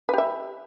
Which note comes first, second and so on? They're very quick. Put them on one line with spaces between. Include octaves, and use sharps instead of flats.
B4 G4 E5